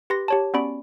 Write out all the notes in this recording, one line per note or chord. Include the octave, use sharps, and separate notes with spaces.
G4 B4 C6 A#6
G4 C#5 A5
B3 C#4 F#4 D5 B5 D7